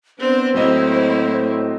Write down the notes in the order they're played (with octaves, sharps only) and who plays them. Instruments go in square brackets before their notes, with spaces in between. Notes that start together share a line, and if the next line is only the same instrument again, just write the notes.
[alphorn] B3 [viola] C4 D4 [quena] C5
[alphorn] A2 [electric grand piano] F#3 C4 D#5 [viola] A#3 E4